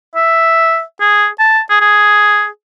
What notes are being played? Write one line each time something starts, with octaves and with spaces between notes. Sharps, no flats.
E5
G#4
A5
G#4
G#4